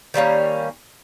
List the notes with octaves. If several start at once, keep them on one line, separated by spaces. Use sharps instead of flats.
D#3 G3 A#3 C#4